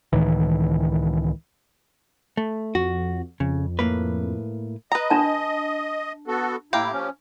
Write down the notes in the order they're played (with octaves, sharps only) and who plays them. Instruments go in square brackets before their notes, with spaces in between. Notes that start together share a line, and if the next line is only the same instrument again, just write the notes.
[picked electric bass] C#2 A2 D#3 E3
[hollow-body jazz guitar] A3
[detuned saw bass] F2 [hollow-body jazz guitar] F#4
[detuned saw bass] F2 [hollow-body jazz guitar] C#3
[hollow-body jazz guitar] A2 A#3 B4
[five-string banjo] B4 A#5 [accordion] D#5
[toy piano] D4 A5
[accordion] B3 F#4 A4
[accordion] A2 E4 [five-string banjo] A#3 G4
[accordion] F3 C#4